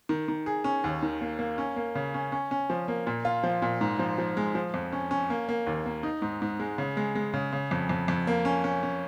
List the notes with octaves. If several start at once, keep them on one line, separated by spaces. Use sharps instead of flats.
D#3
D#3
G#4
C#4
D#2
D#3
A#3
A#3
C#4
A#3
C#3
C#4
C#4
C#4
F3
A#3
A#2
F4
F3
A#2
G#2
F3
F3
G#3
F3
F2
C#4
C#4
A#3
A#3
D#2
A#3
D#4
G#2
G#2
G#3
C#3
G#3
G#3
C#3
C#3
F2
F2
F2
A#3
C#4
C#4
C#4